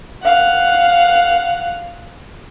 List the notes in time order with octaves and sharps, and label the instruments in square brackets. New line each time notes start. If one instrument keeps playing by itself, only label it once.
[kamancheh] F5 F#5